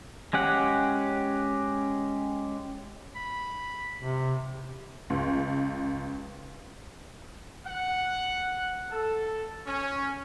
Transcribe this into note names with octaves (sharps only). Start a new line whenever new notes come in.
G#3 C#4 G4 F#5
B5
C3
C#2
F#5
A4
C#4